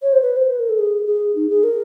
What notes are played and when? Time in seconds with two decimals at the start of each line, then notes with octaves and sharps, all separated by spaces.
0.02 C#5
0.13 C5
0.22 B4
0.36 C5
0.50 B4
0.59 A#4
0.69 A4
0.79 G#4
1.06 G#4
1.36 D#4
1.49 G#4
1.64 A#4